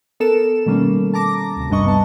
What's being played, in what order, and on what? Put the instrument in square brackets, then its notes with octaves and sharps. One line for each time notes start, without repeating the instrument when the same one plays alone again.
[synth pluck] B3 A4 A#4 E7
B2 D#3 G3 A3 A#3 C#4
A5 A#5 D6 A#6
D2 C3
G#1 G2 G3 D4 D#5 C#6
C3 B3 A5